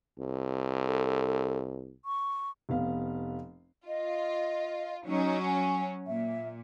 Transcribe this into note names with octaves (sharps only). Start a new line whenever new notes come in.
C2
A4
C#6
F1 B3 F5
F4 D#5
F#3 C#4 D#4
G#5
A#2 E5